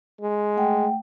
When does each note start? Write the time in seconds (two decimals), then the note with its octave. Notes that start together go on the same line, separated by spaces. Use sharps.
0.21 G#3
0.57 A3 F#5 G5